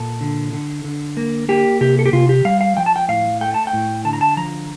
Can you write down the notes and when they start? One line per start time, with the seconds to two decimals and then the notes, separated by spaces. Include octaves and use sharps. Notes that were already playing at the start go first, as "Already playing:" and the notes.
Already playing: A#2 A4
0.21 D3
0.53 D3
0.84 D3
1.17 A#3
1.49 A#3 G4
1.81 C3 G4
1.99 A4
2.06 G4
2.13 C3 F4
2.29 G4
2.45 G3 F5
2.61 F5
2.77 F3 G5
2.86 A5
2.96 G5
3.08 A2 F5
3.41 A3 G5
3.54 A5
3.67 G5
3.73 A2
4.05 D3 A5
4.13 A#5
4.21 A5
4.37 F3 A#5